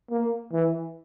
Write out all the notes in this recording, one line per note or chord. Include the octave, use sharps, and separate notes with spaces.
A#3
E3